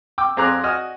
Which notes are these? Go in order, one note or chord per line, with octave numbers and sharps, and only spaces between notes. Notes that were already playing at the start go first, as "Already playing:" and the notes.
G5 D6 E6
F2 C4 G#4 A#5 D6 F#6
F#4 D#5 G#5 D#6 F6